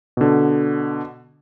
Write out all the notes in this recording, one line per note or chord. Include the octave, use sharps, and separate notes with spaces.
B2 D3